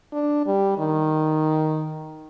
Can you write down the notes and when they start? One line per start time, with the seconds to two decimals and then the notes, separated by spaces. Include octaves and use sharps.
0.13 D4
0.46 G3
0.78 D#3